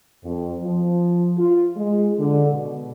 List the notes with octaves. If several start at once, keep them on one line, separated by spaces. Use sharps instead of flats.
F2
F3
F4
G#3
D3
B2